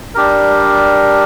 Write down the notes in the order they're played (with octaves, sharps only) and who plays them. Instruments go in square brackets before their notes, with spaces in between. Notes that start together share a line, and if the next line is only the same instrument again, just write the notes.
[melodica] G3 D4 G4 A#4